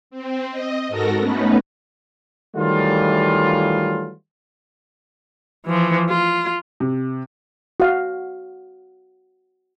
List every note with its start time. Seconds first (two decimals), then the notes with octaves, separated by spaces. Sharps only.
0.11 C4
0.51 D#5
0.89 G#2 F#4 A4 A#4 A#6
1.19 A3 B3 C#4 D#4 B4
2.56 D#3 E3 F#3 G3 A3 F4
5.67 E3 F3
6.09 F4
6.80 C3
7.80 F#4 F5